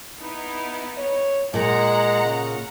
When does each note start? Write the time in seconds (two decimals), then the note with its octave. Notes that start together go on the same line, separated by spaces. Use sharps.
0.19 B3 D#4 E4
0.98 C#5
1.54 A#2 G#3 F#5 A#5
2.24 C#3